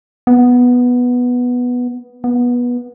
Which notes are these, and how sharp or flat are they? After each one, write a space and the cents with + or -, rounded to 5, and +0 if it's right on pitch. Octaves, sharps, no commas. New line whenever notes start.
B3 -5
B3 -20